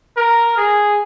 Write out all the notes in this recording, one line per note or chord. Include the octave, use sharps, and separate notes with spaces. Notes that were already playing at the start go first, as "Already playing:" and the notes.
A#4
G#4